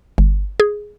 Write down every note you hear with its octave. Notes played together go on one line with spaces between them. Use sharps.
G1
G#4